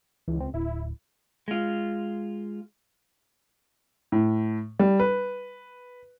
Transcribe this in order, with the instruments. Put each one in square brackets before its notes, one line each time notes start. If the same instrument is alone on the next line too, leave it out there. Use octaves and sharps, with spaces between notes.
[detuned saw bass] C#2 [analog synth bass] E3
[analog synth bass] C4
[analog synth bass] D1 [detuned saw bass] E4
[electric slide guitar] G#3 F4
[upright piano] A2
G3
B4